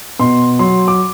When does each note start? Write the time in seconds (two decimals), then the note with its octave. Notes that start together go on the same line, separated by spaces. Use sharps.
0.20 B2 C6
0.59 F#3 C6
0.88 D6